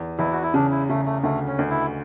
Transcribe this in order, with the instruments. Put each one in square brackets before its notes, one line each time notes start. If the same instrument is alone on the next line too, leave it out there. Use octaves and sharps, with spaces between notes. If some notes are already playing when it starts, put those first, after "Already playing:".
Already playing: [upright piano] E2
[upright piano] E2 [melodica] E4
[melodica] F#4
E4
[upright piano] C#3 [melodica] D4
[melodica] E4
[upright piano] C#3 [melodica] A3
[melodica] A3
[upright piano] D2 [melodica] A3
[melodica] C#4
[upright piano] D2
[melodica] E4